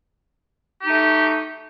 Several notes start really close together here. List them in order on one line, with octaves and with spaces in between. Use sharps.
G4 D#4 A3 F#4